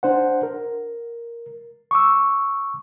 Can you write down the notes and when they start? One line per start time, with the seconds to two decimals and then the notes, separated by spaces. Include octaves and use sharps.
0.03 D4 C5 F#5
0.43 A#4
1.91 C#6 D6 E6